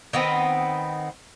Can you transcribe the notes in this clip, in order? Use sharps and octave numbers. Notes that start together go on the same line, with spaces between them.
D#3 B3 C4